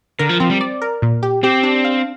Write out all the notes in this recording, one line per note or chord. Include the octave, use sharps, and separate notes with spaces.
D3 A#4
F3
F3 C4
G3
D5
A#4
A#2
G4
C4 G4
D4
F5